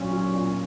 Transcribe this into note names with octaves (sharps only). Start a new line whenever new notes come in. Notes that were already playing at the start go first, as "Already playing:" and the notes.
Already playing: A#2 F#3 C#4
F#3
A#2